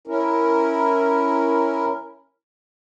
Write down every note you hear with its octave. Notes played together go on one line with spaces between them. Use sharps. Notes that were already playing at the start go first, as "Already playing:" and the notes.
C#4 E4 A#4